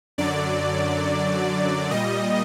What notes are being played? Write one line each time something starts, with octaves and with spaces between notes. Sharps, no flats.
F#2 D3 F#3 D5
A#2 G3 D#5